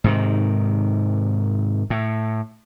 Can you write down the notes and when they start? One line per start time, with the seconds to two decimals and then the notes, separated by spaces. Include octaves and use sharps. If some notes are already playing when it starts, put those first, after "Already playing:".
0.04 G#2 C3 D#3
1.90 A2